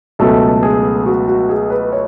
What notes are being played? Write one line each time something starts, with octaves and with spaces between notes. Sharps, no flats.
C#2 B2 F#3 A3 A4
G#4
F#4
F#4
G#4
B4
C#5